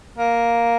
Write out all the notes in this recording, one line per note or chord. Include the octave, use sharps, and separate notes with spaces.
A#3